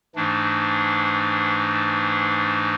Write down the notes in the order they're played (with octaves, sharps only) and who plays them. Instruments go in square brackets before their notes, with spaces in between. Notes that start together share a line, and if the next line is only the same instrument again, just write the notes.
[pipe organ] G#2 E3 A3 D4